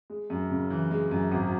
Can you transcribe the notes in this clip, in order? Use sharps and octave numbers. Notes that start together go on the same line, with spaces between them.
G#3
F#2
C#3
E3
G#3
F#2
G#1